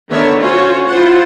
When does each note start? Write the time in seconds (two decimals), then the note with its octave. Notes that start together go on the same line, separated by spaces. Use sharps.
0.10 D3 D#3 B3 A#4 C#5 E5
0.39 C#4 F4 F#4 C5 C#5
0.87 E4 F4 C5 F#5